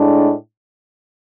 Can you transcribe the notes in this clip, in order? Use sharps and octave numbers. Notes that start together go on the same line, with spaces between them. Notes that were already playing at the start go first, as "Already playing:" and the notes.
Already playing: A2 G#3 D4